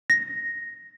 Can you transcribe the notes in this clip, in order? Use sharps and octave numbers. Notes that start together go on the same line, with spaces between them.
A#6